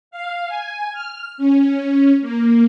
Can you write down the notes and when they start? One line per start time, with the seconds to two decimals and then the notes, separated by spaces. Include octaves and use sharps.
0.11 F5
0.47 G#5
0.93 F6
1.38 C#4
2.21 A#3